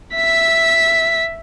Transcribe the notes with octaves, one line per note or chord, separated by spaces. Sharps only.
E5 B6